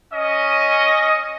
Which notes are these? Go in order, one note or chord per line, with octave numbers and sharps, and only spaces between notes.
C#4 D#5